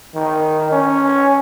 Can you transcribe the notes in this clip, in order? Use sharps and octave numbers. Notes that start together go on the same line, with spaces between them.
D#3
C#4